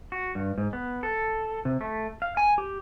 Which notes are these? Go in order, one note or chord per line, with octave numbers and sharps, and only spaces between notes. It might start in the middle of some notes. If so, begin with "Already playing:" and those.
F#4
G2
G#2
B3
A4
C3
A3
F5
G#5
G4